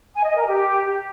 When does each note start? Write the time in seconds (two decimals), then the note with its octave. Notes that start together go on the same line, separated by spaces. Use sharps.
0.14 G#5
0.25 D#5
0.36 A#4
0.47 G4